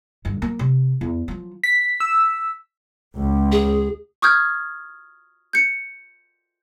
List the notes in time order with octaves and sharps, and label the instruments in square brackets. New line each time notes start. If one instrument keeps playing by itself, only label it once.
[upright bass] G2 D3
F#3 A#3
C3
E2
F3 F#3
[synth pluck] B6
E6
[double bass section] C#2
[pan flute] G#4
[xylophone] C#6 D#6 F6 G6 G#6
G6 C#7